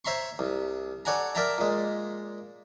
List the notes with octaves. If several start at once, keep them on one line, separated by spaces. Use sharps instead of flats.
C5 C#5 E5 A#5 C6 C#6
C2
A4 C#5 D5 F#5 G#5 A#5
A#4 D5 E5 G5 A5 A#5
A#2 G#3